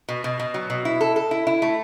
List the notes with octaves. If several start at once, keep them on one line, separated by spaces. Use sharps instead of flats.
B2
B2
B2
F#3
B2
E4
A4
A4
E4
E4
A3